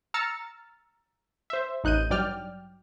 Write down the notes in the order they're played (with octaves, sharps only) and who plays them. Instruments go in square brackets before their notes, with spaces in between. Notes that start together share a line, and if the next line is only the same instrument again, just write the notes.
[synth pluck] A#5 E6 F6 A6 C#7
C5 E5
A1 D#4 F#6 G6 D#7
G2 F#3 D5 G5 F6